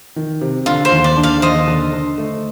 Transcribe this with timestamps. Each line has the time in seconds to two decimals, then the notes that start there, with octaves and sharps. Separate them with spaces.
0.16 D#3
0.41 C3
0.66 D3 F4
0.85 C5
0.92 D#2
1.04 D5
1.17 D4
1.23 D5 F5
1.42 D#2 C5 D#5
1.68 D3
1.93 D3
2.18 A3